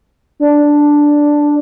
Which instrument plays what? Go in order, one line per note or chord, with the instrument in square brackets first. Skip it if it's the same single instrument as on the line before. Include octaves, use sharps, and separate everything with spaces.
[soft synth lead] D4